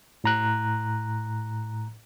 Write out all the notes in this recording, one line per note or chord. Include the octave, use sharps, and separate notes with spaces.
A2 A#5 F#6